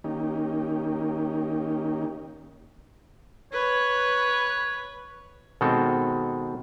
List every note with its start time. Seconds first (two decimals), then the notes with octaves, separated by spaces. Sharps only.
0.04 D#3 A#3 C#4 D#4 G4
3.53 B4 C#5
5.61 B2 D#3 G#3 C4 A4